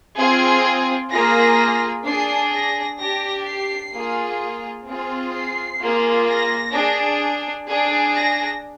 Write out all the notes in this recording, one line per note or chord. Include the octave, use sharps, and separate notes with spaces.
C4 F4 G#4 G#6
A#3 F4 G#4 A#6
D4 G#4 C7
A#6
D4 G4 A#6
C7
A#3 F4 G#4
C4 F4 G#4
C7
A#3 F4 G#4
A#6
D4 G#4
D4 G#4
A#6